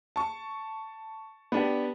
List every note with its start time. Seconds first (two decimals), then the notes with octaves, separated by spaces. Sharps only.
0.16 A5 C#6
1.52 B3 D4 G4